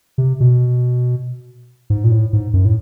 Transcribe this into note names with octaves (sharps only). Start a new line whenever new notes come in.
C3
B2
G#2
A#2
A2
G#2
F#2
A2